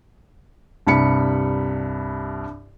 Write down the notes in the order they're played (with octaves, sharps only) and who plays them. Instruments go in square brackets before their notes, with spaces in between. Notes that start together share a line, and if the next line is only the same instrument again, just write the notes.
[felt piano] C2 G2 B5 C#7